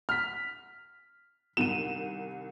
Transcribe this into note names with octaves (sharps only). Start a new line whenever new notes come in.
F6 B6
C2 D#3 D#7 E7